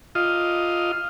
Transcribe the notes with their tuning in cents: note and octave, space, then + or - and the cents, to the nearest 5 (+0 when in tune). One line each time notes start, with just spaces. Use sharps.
F4 +0 D#5 +5